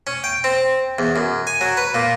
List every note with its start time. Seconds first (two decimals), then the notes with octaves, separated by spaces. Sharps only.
0.07 C#4
0.24 G5
0.44 C4
0.99 E2
1.16 F#2
1.47 G#5
1.61 F#3
1.77 B4
1.95 A#2